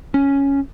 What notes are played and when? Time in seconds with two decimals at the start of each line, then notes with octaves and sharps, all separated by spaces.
0.14 C#4